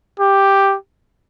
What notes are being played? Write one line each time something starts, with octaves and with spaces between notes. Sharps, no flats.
G4